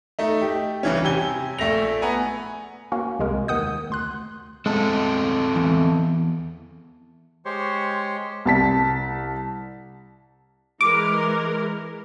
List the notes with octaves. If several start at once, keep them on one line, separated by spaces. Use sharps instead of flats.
A3 D#4
G4
C2 C#3 E3 C#4
C3 G4 G#5 G7
A#1 A3 A#6 F7
B3 G#5 A#5
A#3 C#4 F#4
C2 C3 G#3 A#4
D#2 D#3 F#5 D#6 G6
D2 C6 F#6
G#3 C4 E4 A4
E2 E3
G#3 G4 C5 C#5 C6 C#6
C2 A5 B6
E3 G#3 A#4 D6